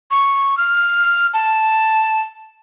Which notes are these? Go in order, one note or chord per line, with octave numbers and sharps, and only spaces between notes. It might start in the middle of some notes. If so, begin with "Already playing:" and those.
C#6
F6
A5